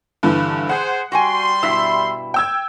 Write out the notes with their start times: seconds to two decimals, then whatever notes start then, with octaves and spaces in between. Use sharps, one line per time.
0.23 G2 D3 E3
0.69 G#4 C5 F#5
1.12 G3 F#4 G5 G#5 C6
1.63 G2 B2 E4 E6 B6
2.34 G5 E6 G#6